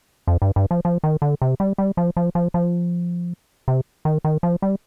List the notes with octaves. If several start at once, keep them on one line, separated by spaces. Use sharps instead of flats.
F2
G2
G2
F3
F3
D#3
D3
C3
G3
G3
F3
F3
F3
F3
C3
D#3
D#3
F3
G3